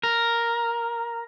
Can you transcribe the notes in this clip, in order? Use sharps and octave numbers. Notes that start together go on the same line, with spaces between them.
A#4